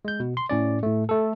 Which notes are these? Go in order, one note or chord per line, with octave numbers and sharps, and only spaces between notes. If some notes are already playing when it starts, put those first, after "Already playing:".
G#3 G6
B2
C6
A2 C#4 D5
A2 A3
A3 A4